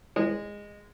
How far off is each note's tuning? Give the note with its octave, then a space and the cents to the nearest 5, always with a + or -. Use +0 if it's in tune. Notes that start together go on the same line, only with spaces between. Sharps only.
G#3 -15